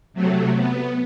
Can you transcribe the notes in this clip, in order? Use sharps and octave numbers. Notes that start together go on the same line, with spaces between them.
C3 F#3 A3
B3